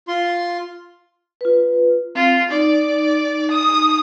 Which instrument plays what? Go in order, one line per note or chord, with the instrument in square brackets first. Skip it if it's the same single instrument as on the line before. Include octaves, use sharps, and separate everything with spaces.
[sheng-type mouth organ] F4 C6
[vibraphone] F4 B4
[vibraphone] C4 [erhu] F4
[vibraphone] D#4 [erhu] D5
[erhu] D#6